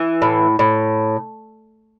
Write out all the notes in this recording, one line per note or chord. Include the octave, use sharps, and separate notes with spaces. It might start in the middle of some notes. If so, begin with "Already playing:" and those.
Already playing: E3
A2
A2